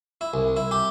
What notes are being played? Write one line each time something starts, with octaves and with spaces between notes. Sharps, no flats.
E4
C2
E4
G4